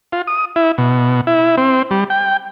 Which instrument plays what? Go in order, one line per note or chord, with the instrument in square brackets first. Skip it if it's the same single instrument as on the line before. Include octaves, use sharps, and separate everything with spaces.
[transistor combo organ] F4
D#6
E4
B2
E4
C4
G3
G5